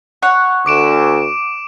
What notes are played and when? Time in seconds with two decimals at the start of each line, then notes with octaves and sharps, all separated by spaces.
0.22 C#5 F#5
0.66 D2 D6 D7 E7